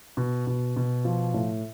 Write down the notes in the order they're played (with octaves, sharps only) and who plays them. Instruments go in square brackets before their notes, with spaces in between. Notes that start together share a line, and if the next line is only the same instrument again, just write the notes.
[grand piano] B2
B2
B2
F3
A2